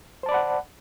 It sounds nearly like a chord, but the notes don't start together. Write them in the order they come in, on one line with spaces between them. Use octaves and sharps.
C5 A5 D5 B5 F#5